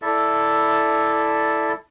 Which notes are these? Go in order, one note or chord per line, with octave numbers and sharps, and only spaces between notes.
E4 A4 D5 E5